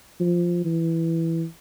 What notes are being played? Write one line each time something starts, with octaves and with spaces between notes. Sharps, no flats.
F3
E3